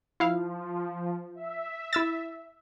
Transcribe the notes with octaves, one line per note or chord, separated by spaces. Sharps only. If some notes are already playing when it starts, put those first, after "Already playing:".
F3 E4 F5
E5
E4 E6 A6